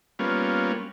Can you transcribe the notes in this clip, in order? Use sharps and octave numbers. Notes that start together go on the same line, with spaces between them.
G3 A#3 B3 C#4 F4